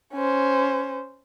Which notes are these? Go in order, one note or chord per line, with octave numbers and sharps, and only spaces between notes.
C#4 C5